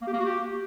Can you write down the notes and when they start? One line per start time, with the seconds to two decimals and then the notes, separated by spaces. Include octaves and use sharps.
0.01 A#3
0.07 G4
0.13 A#3
0.19 F#4
0.25 G4